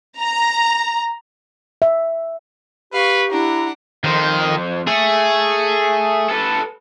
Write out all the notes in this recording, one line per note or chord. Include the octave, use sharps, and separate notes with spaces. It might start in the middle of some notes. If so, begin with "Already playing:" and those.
A#5
E5
G4 B4 F5 C#6
D4 E4 F#5 A#5
F2 D#3 C5
A3 G#4
A4 B4